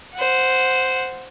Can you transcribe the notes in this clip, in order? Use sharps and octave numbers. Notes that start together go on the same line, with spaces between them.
C5 F#5